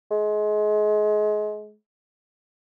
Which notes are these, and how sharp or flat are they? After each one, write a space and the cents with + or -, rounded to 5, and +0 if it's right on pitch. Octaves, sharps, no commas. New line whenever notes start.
G#3 +30